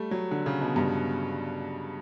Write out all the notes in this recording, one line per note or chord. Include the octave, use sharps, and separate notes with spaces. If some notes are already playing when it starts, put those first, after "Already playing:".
Already playing: G3 A3
F#3
D3
C#3
B2
G2